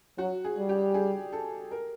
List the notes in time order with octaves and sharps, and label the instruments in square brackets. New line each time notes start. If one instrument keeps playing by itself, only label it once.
[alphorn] F#3 [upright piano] F#4
[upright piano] G#4
[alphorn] G3
[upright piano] G4
G#4
A4
A#4